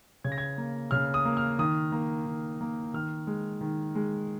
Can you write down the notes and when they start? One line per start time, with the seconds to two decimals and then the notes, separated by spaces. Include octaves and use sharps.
0.24 C#3 G#6
0.32 A#6
0.38 G#6
0.58 A#3
0.91 C#3 F6
1.14 D#6
1.25 A#3
1.37 F6
1.59 D#3 D#6
1.92 A#3
2.26 D#3
2.61 A#3
2.93 D#3 F6
3.27 G#3
3.61 D#3
3.95 G#3